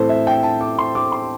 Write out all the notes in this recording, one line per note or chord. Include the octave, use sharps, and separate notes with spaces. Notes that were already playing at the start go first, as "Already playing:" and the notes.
Already playing: A2 E3 C4 E4 A4 C5
E5
G5
A5
D6
C6
D6
C6